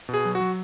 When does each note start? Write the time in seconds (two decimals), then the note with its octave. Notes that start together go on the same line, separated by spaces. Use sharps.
0.09 B2
0.14 G#4
0.25 F#3
0.35 F#4
0.40 F#3